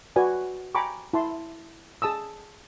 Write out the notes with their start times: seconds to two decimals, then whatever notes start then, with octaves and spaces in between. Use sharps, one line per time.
0.16 F#4 B4 D5 G#5
0.75 G5 G#5 A#5 B5 C#6 D6
1.13 E4 A5 C6
2.02 G#4 A5 D#6 E6